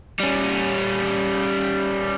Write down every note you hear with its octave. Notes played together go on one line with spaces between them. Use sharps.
G3 C#4